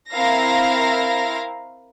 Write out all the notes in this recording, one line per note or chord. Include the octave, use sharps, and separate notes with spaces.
C4 E4 A#4 F5 A#6